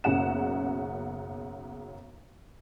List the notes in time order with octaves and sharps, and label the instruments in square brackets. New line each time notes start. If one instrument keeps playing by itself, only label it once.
[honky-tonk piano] F#1 B1 F#2 C#3 F#5 E7